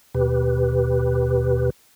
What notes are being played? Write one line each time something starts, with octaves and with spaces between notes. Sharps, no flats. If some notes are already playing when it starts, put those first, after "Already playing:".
D#2 B2 G4 B4